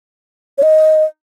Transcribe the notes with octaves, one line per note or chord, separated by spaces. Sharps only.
C#5
D#5